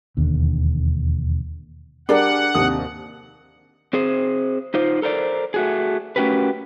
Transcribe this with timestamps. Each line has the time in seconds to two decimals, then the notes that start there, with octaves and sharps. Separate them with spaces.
0.17 E1 D#2 D3
2.09 G3 D4 G#4 A#4 D5 F#5
2.55 D#2 C3 D#6
3.93 C4 G#4 C5
4.74 D#4 F4 C5
5.02 A4 A#4 C5 D5
5.54 A3 F#4 G#4
6.16 A3 C#4 F#4 G4 A#4 B4